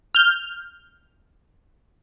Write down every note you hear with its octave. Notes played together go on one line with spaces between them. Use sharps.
F6 G6